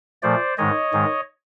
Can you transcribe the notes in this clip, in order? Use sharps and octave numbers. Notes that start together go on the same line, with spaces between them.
A#2 F3 A3 C5 D5
G#2 D#3 G#3 C#5 D#5
G#2 D#3 G#3